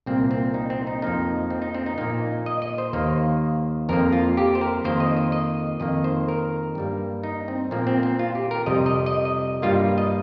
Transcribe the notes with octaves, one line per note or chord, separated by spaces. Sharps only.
C2 A#2 A#3 C4
C4
D#4
C4
D#4
F2 F3 A#3 D#4
C4
D#4
C4
D#4
A#2 A#3 D#4
D#5
D#5
C5
D#2 D#3 A#3
F2 F3 A#3 A#4
F4
G4
C5
A#4
F2 D#3 A#3 C5
D#5
C5
D#5
F2 D#3 A#3 D#5
C5
A#4
G2 G3 A#3
D#4
C4
A#2 F3 A#3 C4
C4
C4
F4
G4
A#4
F2 C3 G3 D#5
D#5
D#5
D#5
G2 G3 A#3 F4
D#5